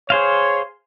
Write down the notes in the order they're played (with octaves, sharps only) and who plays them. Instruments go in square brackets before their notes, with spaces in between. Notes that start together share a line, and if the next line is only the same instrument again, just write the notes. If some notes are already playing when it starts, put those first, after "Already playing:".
[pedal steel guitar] G#4 C5 F5 [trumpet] C#5